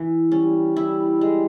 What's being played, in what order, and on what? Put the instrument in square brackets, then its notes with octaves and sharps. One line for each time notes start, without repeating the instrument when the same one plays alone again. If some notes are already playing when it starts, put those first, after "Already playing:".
Already playing: [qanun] E3
[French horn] G3 [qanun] C#4
[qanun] E4
G#3